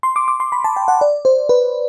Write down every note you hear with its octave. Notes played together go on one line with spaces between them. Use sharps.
C6
D6
D6
C6
B5
A5
G5
F#5
D5
C5
B4